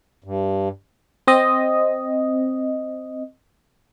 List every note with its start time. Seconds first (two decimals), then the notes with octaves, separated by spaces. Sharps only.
0.24 G2
1.27 C4 D#5